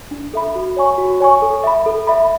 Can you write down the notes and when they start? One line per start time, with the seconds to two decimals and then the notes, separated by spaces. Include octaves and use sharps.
0.11 D4
0.33 A4 E5 B5
0.55 F#4
0.77 C#5 G#5 C#6
0.98 F#4
1.20 C#5 G#5 C#6
1.42 A4
1.64 E5 B5
1.86 A4
2.07 E5 B5